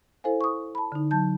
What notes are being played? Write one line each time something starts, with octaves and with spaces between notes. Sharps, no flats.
E4 A4 C5 F5 G#5
C#6 D#6
A5 B5
D3 D#4
F#3 A5 G6